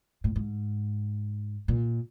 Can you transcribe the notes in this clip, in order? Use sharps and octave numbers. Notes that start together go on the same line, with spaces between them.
A2
G#2
A#2